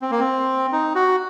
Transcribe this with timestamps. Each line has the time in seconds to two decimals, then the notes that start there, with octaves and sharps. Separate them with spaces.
0.02 C4
0.11 A#3
0.20 C4
0.72 D#4
0.95 F#4